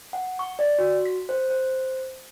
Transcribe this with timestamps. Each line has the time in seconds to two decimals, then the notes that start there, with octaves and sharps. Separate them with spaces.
0.13 F#5
0.39 C#6
0.59 D5
0.78 F#4
1.06 B6
1.29 C5
1.50 C5